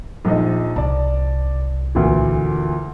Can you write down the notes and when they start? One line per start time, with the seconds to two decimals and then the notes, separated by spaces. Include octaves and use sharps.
0.25 A#1 F3 D#4
0.76 C2 D5 A5
1.95 D2 A#2 E3